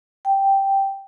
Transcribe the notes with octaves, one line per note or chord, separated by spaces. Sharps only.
G5